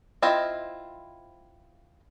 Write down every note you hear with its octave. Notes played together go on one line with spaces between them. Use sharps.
C4 E4 F4 C5 D#5